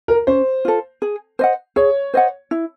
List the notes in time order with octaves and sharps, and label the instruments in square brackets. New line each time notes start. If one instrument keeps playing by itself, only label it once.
[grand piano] A#4
[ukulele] C#4 [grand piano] C5
[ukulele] F4 A4
G#4
C5 D#5 F#5
[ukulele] G#4 [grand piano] C#5
[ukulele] C5 D#5 F#5
E4